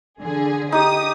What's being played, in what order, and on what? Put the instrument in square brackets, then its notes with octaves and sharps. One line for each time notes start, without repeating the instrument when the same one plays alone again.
[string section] D3 G#4
[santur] D#4 G4 [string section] D#6